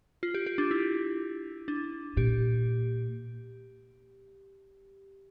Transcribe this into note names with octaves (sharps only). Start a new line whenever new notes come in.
F4
G4
G4
D4
E4
D4
A#2 G4